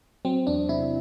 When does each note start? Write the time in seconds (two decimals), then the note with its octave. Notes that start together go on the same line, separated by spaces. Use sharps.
0.25 F#3 C4
0.47 E2 D4
0.69 C3 E4